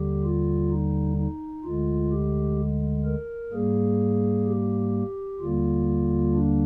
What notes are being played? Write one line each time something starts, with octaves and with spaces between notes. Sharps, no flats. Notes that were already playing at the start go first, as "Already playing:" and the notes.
Already playing: D#2 D3 G3 G4
F4
D#4
D#4
D2 D3 G#3 F4
G4
A#4
G#2 G3 A#3 G#4
G4
D#2 D3 G3 A#3 F4
D4